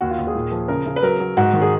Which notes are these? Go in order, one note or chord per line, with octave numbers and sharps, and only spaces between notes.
D#2 F#4
F4
D#2
G#4
A#2
F3
C#3 A#4
C#3
B4
F#3 A#4
F#3
G#2 F#4
D#3
G#4